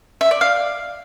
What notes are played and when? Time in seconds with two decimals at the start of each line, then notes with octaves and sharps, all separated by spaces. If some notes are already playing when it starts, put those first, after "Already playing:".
0.21 E5
0.31 D5
0.41 F5